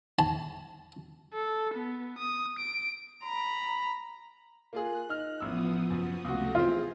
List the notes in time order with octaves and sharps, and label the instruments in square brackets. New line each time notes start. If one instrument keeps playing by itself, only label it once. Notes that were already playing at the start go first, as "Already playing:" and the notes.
[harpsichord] A5
[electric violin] A4
B3
D#6
D7
[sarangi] A#5 [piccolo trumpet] B5
[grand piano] A#3 F4 G#4 [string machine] F#6
[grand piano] D#4 F6
[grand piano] A1 E6 [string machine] F3 B3 D#6
[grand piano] F#2
[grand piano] C#2 F#4 [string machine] C3 A3 A#6
[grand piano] E3 C4 [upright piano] F4 [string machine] G#4